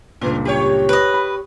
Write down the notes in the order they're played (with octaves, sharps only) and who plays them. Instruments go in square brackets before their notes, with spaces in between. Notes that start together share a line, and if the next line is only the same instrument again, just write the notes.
[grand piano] C#2 G2 A#2 [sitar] B3
[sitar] G4 C#5
[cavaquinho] B4 D#5
[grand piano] B5